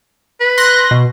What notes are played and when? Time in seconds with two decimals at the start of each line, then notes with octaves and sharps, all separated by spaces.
0.40 B4
0.58 C6 F#6 A#6
0.91 B2